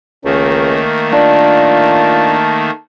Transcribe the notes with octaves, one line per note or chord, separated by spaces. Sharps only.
C#2 D#3 A3 A#3 C#4
D4 F4 A5